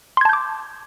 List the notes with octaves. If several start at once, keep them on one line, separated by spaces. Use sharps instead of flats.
A5 C6 D6 G6 G#6